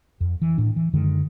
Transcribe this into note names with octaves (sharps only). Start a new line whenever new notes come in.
F2
E3
A2 D4
E3
F#2 D3 D#3 G#3